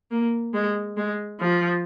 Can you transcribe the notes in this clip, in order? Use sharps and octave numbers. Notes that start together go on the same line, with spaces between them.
A#3
G#3
G#3
F3